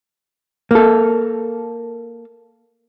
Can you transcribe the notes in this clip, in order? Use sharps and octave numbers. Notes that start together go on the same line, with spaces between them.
A#3 A4